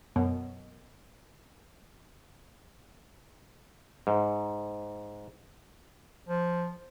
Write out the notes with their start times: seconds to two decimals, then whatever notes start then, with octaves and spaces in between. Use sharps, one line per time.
0.16 F#2 B2
4.07 G#2
6.28 F3